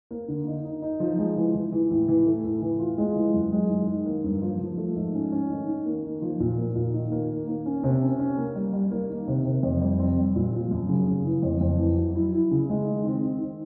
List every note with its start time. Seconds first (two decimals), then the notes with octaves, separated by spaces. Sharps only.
0.11 A#3
0.28 D3
0.47 D#4
0.64 D#4
0.82 D#4
1.00 F3
1.18 G#3
1.36 E3
1.54 E3
1.72 E3
1.90 A2
2.08 E3
2.27 A3
2.44 A2
2.62 E3
2.80 F4
2.98 G#3
3.16 E3
3.34 F#2
3.52 G#3
3.70 D#3
3.88 D#3
4.06 A#3
4.24 G2
4.42 F3
4.60 F3
4.77 A3
4.96 G#2
5.14 C#4
5.32 C#4
5.50 D#3
5.68 D#3
5.86 A#3
6.04 D#3
6.22 F3
6.40 A#2
6.58 A#3
6.75 A#2
6.94 D#3
7.12 A#3
7.30 D#3
7.48 A#3
7.66 C#4
7.84 C3
8.01 C#4
8.19 C#4
8.37 A#3
8.55 G3
8.73 G3
8.91 A#3
9.09 D#3
9.28 C3
9.45 C3
9.63 F2
9.81 G3
9.99 C4
10.17 G3
10.36 A#2
10.53 F3
10.71 F#2
10.89 C#3
11.07 C#3
11.25 E3
11.43 F2
11.61 F2
11.79 E3
11.97 F#3
12.15 E4
12.33 E4
12.51 C#3
12.69 G#3
12.87 D#3
13.05 C4
13.23 D#3
13.41 D#3